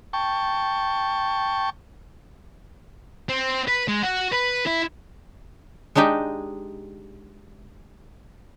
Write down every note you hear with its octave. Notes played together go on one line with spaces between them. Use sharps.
G5 A5 C#6
C4
B4
G#3
F#4
B4
E4
G#3 D4 D#4 G4 D#5